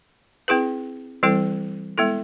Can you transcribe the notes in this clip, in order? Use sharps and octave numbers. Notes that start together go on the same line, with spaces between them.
C4 E4 G#4 B4
E3 G3 C4 E4 A4
G#3 B3 E4 A4